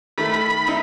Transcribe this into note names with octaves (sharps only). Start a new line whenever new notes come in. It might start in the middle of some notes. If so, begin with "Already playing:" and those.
D#3 A3 B5
D#4 E4